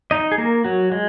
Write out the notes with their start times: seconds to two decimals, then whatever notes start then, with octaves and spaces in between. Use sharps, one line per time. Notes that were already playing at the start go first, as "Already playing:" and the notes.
0.11 D#4 D#5
0.32 G#4
0.38 A#3 A#4
0.64 F#3 F#4
0.92 G#3